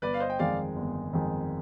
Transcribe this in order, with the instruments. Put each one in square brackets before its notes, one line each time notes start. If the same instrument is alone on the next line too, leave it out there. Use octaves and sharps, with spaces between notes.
[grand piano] G1 [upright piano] B4 D5
[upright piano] F5
C5 D#5
G5
[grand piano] F2 D#3 G#3 [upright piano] D5 F5
[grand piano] G1
F2 D#3 G#3